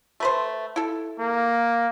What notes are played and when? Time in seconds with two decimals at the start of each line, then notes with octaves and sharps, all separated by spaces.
0.20 A3 B4 C5
0.76 E4 A4
1.19 A#3